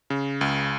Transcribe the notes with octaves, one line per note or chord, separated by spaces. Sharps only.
C#3
C#2